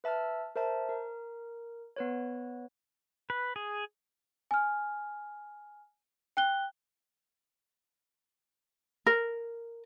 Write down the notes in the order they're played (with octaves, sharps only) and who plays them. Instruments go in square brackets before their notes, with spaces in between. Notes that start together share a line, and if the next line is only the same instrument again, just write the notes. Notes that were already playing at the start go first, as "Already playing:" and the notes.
[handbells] B4 E5 A5 E6 F6
A#4 C5 E5 A5
A#4
B3 B4 C#5
[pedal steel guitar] B4
G#4
[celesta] G#5 F6
G5 F#6 G7
[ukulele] A#4